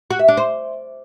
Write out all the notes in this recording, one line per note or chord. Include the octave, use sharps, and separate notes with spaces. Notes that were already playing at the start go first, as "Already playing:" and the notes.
F#4
E5
D4
C5